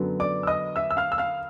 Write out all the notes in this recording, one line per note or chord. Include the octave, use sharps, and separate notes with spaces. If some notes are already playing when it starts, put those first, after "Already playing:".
Already playing: F#2 D3 F#3 B3
D5 D6
E6
D#5 D#6
E5 E6
E6
F5 F6
E6
F5 F6